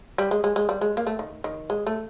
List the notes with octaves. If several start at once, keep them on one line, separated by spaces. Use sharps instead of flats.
G3
G#3
G#3
G#3
G3
G#3
A#3
A3
D#3
D#3
G#3
A3